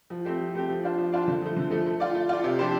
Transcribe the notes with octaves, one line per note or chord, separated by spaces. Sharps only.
F3
A3 C4 G4
F3
A3 C4 G4
F3
D4 F4 C5
F3
D4 F4 C5
D3
F3 A3
D3
F3 A3
A3
F4 D5
A3
F4 D5
C3
F3 D4 G4 C5